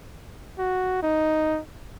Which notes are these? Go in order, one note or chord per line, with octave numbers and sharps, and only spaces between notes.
F#4
D#4